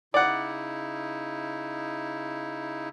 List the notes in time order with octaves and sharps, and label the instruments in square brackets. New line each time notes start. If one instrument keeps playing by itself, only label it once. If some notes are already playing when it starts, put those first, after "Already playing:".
[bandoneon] C#3 D#4 E4 [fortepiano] D5 F#5